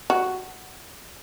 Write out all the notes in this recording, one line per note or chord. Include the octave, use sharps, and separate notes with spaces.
F#4